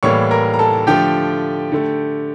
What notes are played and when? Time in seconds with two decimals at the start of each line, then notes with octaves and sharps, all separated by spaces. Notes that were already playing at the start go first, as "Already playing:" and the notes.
0.03 A2 E3 G3 A#3 C#5 C#6
0.31 A#4 A#5
0.54 A#5
0.59 A4 A5
0.87 D3 F3 A3 G4 G5
1.72 D3 A3